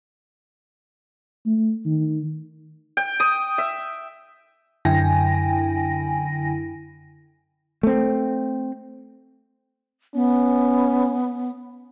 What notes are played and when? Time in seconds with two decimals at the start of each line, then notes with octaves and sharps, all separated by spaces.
1.46 A3
1.85 D#3
2.97 G5
3.20 D#6
3.58 E5
4.85 F#2 D3 E4 G5 G#5 A#6
7.83 A3 C4
10.15 B3 C#4